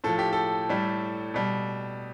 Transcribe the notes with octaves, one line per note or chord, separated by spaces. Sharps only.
A2 F3 A4
G4
A4
A2 G3
B2 G3